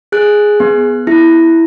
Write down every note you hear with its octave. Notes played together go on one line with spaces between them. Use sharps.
G#4 F#6
B3
E4